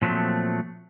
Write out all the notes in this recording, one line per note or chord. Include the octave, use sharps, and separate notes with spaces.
A#2 F3 F#3 A3 C4